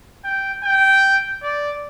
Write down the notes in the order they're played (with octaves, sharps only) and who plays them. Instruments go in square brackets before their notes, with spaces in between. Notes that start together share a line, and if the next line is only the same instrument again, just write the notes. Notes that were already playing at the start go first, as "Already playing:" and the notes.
[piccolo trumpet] G5
G5
D5